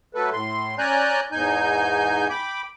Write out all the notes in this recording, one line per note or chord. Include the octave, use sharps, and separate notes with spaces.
F#3 A3 A4 B4
A2 C6
C#4 D5 G#5 A#5 F#6 G6
E2 G#2 D#4 G#5 G6
G5 B5 D6